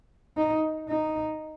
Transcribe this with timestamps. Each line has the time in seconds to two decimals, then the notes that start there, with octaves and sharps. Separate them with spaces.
0.37 D#4
0.89 D#4